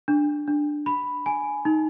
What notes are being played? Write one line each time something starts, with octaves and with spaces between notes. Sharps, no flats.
D4
D4
B5
G#5
D#4